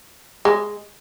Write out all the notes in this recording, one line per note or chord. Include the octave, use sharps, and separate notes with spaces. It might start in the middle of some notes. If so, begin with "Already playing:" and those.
G#3